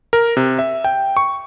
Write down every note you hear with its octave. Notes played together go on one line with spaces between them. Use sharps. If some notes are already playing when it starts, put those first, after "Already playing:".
A#4
C3
E5
G5
C#6